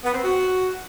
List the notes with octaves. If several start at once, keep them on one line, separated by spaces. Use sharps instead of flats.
B3
C4
F#4